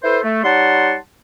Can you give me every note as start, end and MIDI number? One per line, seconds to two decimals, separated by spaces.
0.03 0.19 64
0.03 0.19 69
0.03 0.19 71
0.03 0.19 72
0.23 0.43 57
0.44 0.96 55
0.44 0.96 63
0.44 0.96 73
0.44 0.96 78
0.44 0.96 81
0.44 0.96 84